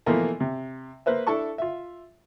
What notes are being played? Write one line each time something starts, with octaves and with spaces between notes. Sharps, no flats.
B2 E3 F3 A3 A#3
C3
A#3 B4 C5 E5
D4 E4 A4 A5 C#6
F4 E5